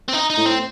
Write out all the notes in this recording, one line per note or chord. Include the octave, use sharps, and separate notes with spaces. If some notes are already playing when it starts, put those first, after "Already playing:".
C4
D#4
D#4
A2
C4